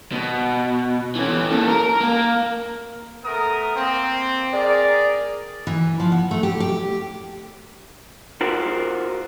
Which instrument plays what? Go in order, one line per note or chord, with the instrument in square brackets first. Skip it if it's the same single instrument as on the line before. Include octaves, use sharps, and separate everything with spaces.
[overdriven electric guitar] B2
E3 C#4
A#3 A4
A#4
A#3
[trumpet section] A3 B3 A#4 A#5 D#6
A#3 C4
G#4 A#4 D5
[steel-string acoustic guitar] E3
F3
B3
A3
G4
G4
[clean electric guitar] F4 F#4 A#4 C5